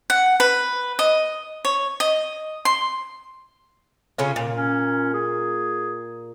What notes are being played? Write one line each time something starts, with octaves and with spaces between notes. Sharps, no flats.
F#5
B4
D#5
C#5
D#5
C6
C#3 C#4 F4
A#2
C#4
G#4